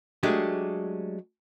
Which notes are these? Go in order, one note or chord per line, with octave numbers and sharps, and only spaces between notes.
F#3 G#3 A3 D4 G4